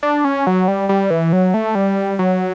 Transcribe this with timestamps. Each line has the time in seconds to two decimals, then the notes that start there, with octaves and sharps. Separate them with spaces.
0.03 D4
0.25 C#4
0.47 F#3
0.68 G3
0.89 G3
1.10 E3
1.33 F#3
1.54 A3
1.75 G3
2.19 F#3